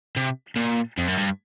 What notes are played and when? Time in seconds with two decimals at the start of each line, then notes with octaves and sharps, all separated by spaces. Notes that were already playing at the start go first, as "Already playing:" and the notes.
0.17 C3
0.56 A#2
0.98 F2
1.08 F#2
1.17 G2